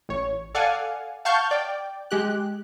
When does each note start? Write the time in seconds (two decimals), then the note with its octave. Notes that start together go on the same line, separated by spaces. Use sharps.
0.09 A1 C#5
0.55 A4 D5 F5 F#5 G#5
1.25 F5 F#5 A5 C#6 F6 G6
1.51 D5 G5
2.11 G#3 G4 F#6